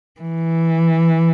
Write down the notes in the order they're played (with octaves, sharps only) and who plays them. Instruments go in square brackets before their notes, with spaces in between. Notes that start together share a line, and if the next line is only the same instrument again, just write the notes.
[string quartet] E3